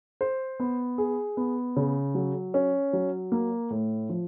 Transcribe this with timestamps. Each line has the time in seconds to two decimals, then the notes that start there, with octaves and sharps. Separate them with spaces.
0.21 C5
0.60 B3
0.98 G#4
1.37 B3
1.76 C#3
2.15 F#3
2.54 C#4
2.93 F#3
3.32 A#3
3.70 A2
4.09 F3